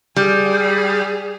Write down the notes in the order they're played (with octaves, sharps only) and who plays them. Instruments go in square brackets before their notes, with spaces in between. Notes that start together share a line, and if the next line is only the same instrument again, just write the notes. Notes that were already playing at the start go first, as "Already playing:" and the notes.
[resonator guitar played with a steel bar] G3 [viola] G#4